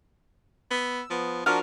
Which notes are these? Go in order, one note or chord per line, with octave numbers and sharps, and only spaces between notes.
B3 E6
F3 B3
F3 D4 F#4 A#4 F6